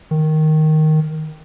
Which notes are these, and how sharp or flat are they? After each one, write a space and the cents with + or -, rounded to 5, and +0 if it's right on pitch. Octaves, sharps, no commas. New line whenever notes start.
D#3 +0